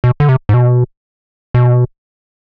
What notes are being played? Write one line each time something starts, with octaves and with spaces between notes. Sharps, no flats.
B2
D3
C3
G#2
B2
B2